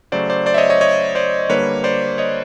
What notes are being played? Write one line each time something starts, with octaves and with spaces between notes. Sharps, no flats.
C#3 F#3 A3 C5 D5
C5 D5
C5 D5
E5
C#5 D#5
C#5 D#5
C#5 D#5
C5 D5
D3 G3 A#3 B4 C#5
C5 D5
C#5 D#5